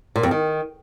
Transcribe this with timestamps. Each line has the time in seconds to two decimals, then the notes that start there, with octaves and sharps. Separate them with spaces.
0.16 A#2
0.23 F2
0.31 D#3